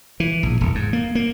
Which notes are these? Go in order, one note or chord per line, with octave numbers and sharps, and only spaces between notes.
E3
A#1
D#1
G#2
A#3
A#3